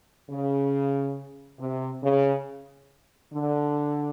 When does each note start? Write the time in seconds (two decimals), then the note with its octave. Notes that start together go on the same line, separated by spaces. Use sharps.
0.30 C#3
1.59 C3
2.03 C#3
3.33 D3